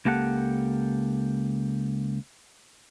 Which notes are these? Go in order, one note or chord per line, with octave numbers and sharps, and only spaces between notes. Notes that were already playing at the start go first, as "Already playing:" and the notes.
C#2 A#3 G4 A4 F#5